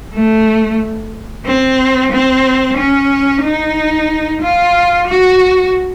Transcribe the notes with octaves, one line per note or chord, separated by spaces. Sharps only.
A3
C4
C4
C#4
D#4
F4
F#4